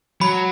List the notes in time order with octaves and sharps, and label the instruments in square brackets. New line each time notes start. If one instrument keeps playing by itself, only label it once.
[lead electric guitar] F#3 [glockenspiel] B5